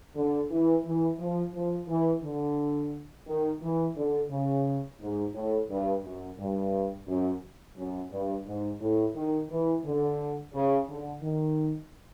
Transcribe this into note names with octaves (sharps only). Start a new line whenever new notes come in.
D3
E3
E3
F3
F3
E3
D3
D#3
E3
D3
C#3
G#2
A2
G2
F#2
G2
F#2
F#2
G2
G#2
A2
D#3
E3
D3
C#3
D3
D#3